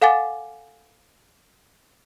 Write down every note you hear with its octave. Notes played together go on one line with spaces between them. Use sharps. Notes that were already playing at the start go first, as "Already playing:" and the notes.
A4 F5 F#5 G#5 D6 A6